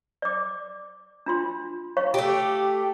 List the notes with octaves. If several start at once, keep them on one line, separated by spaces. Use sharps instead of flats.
D5 D6
D4 F4 C6
C#5 F5 C#6
A3 G4